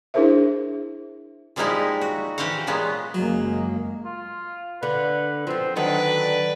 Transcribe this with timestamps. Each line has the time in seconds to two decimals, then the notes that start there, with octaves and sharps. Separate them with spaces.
0.14 D4 E4 G#4 A#4 C5 E5
1.56 A#2 F3 G3 G#3 D#4 E4
2.01 F#4
2.38 E3 G4 C5 F5 F#5
2.67 A#2 F#3 G#3 B3
3.14 F#1 F#3 G#3 A#3
4.05 F4
4.83 D3 B4
5.47 F3 B3 C4
5.76 D3 D#3 F#3 D4 B4 D5